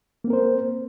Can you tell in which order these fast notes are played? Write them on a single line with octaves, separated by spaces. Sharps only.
A#3 C4 A#4 C5